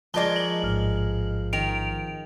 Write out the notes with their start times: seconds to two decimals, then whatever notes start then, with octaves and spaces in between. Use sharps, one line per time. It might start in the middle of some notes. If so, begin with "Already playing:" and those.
0.14 F3 G#3 A#4 B4 D5 D#5 A5 G7
0.36 F#7
0.63 A1 G#2 F6
1.53 D#3 D7 F7